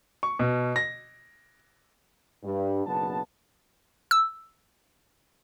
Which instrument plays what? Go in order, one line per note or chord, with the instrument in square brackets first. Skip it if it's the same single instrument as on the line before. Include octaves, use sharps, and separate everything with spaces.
[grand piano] C#6
B2
A#6
[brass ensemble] G2
F#1 B1 C#3 B3 D4 A5
[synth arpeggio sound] E6